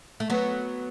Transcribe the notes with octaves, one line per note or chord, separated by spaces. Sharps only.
A3
F#3 B3